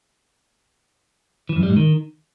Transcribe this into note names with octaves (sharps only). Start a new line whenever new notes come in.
E3
F#2
G3
G#2
D#3